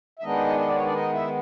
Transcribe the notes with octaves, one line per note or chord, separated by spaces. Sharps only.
E5
D#3 G#3 B3 D4 D#4 D#5
D#5
D5
C#5
D4 D5
D#4 D#5
E4 E5